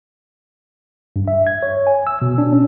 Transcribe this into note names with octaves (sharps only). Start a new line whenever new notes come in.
G2
E5
G#6
C#5
G#5
E6
B2
D4
C#4